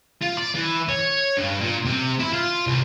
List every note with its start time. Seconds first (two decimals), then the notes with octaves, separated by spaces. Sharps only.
0.22 F4
0.37 D5
0.55 E3
0.89 C#5
1.37 G2
1.61 A#2
1.86 C3
2.20 E4
2.34 F4
2.67 C2